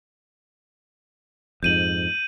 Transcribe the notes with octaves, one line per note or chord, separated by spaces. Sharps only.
F2 G#2 G6 D#7 F#7